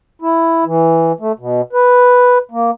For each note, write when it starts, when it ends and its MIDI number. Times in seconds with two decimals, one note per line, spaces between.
0.22 0.64 64
0.65 1.12 52
1.20 1.32 57
1.39 1.61 47
1.73 2.38 71
2.51 2.71 58